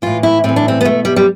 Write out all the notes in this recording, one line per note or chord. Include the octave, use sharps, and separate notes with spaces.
A2 E3 F4
E4
A2 E3 C4
D4
C4
B3
B2 A3
G3
G3